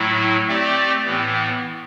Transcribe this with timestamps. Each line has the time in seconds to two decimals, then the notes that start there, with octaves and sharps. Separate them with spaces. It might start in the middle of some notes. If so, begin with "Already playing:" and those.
Already playing: A2 F#3 A3 E4
0.48 A3 C4 G4 D5
1.04 A2 E3 B3